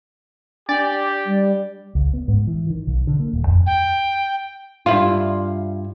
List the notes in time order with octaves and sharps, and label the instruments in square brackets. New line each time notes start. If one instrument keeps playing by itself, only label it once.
[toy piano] D4 [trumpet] G4 [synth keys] D5
[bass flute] G3
[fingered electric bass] C#2
B3
G#2
E3
D#3
B1
D3
A#3
D#1
F2
[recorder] G5
[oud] G2 E4 F4